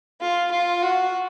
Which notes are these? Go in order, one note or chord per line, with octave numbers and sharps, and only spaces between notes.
F4
F4
F#4